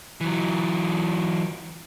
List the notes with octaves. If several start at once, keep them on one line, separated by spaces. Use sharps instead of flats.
E3 F#3